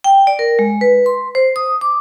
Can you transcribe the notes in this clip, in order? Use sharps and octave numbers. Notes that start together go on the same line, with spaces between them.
G5
D5
A#4
G#3
B4
C6
C5
D#6
D6